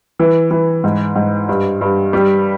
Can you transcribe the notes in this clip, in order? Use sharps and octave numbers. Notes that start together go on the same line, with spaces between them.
E3
E3
G#2
G#2
G2
G2
G3